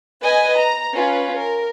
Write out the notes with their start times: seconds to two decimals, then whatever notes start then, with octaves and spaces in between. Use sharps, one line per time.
0.21 B4 D#5 G#5
0.58 A#5
0.92 C#4 F4 B4
1.38 A#4